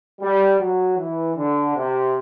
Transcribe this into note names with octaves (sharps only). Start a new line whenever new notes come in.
G3
F#3
E3
D3
C3